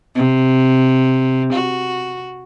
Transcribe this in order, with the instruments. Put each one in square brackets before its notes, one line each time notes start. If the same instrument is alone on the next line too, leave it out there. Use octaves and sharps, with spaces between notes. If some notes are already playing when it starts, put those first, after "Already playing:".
[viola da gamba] C3
F#4